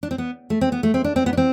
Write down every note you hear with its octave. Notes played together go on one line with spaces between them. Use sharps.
D4
C4
B3
A3
C4
B3
A3
C4
D4
C4
B3
D4
C4